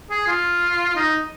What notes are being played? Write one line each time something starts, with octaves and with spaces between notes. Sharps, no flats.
G#4
F4
D#4